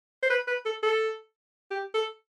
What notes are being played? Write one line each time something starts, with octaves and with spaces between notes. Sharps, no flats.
C5
B4
B4
A4
A4
G4
A4